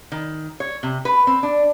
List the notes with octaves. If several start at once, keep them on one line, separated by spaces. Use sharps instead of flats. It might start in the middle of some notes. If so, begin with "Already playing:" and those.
D#3
C#5
C3
B4
C4
D4